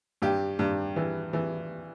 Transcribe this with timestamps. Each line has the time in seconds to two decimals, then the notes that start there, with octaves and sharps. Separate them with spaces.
0.22 G2 G4
0.59 G2
0.96 E3
1.33 E3